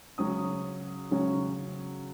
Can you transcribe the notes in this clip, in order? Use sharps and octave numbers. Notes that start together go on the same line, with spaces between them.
C#3 F#3 C#4 D#6
C#3 F#3 C#4